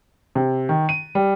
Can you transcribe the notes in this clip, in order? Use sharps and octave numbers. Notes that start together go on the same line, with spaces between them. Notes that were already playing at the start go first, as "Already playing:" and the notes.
C3
D#3
D#7
G3